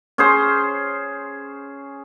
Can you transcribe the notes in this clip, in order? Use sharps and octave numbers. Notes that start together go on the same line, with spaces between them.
C#4 G#4 C5